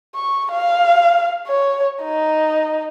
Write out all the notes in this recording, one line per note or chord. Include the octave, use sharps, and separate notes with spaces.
C#6
F5
C#5
D#4